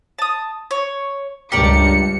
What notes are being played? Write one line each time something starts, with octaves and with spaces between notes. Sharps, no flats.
A5 D#6
C#5
C#2 G2 G4 A#4 D5 C#7